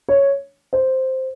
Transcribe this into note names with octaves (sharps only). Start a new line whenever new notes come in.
C#5
C5